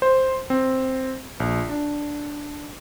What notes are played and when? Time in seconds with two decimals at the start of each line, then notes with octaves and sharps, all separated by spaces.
0.02 C5
0.50 C4
1.40 A#1
1.69 D4